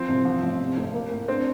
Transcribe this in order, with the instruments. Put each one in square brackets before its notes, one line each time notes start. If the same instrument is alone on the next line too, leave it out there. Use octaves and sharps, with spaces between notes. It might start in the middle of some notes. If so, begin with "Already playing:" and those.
Already playing: [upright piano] F3 [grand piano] C4
[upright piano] C2
F3
A1
C3
F1
A#3
A2
[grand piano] C4 [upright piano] D4